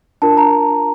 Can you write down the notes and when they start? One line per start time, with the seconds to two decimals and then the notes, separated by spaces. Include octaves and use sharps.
0.22 D4 F4 A#4 A5
0.37 A#5